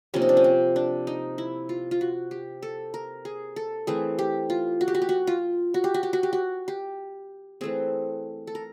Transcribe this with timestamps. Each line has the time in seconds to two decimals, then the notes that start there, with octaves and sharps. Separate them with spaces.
0.14 C3 F3 A#3 C#4
0.22 D#4
0.29 D4
0.37 C#4
0.44 C4
0.76 D4
1.07 D#4
1.38 E4
1.69 F4
1.91 F4
2.01 F#4
2.31 G4
2.63 A4
2.94 A#4
3.25 G#4
3.56 A4
3.87 E3 A3 C4 G#4
4.19 G4
4.50 F4
4.81 F#4
4.88 G4
4.95 F#4
5.02 G4
5.09 F#4
5.27 F4
5.74 F#4
5.84 G4
5.94 F#4
6.03 G4
6.13 F#4
6.23 G4
6.33 F#4
6.68 G4
7.61 E3 A3 C4 G#4
8.47 A4
8.55 A#4